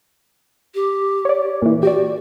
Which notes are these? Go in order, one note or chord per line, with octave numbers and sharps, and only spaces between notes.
G4
C#5 D5
A#2 E3
F#4 G4 D5